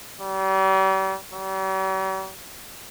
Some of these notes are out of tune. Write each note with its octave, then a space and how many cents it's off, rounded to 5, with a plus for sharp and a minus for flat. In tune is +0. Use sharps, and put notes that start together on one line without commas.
G3 -40
G3 -45